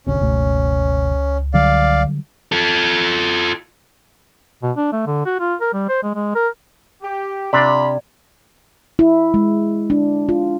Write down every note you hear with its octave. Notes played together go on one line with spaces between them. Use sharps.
G#1 D2 C3 C#4
F#1 C#2 B2 A3
D3 F#3 G3 D5 F5
F4 A4
B2
D4
A3
D3
F#4
F4
A#4
G3
C5
G#3
G#3
A#4
G4
C3 D4 F4 D5 B5
E4
G#3
D4
F4